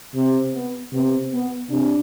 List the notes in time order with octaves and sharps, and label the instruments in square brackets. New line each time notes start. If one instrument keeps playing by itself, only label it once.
[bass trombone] C3
[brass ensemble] B3
[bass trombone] C3 [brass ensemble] B3
[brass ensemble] B3
[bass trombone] C3 [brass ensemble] D4